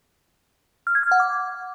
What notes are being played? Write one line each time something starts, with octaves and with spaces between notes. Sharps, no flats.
F6
G#6
F6
F#5
D6